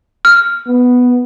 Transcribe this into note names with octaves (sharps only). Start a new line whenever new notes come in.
F6
B3